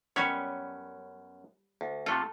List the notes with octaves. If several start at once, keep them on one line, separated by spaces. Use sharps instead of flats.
F#2 G3 B3 C#4 C#5
D2
C3 A3 F4 A4